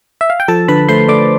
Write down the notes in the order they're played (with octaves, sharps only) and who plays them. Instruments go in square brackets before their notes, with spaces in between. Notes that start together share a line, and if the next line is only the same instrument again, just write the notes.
[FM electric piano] E5
F5
G5
F3 A4 A5
D3 B4 B5
A3 C5 C6
A3 D5 D6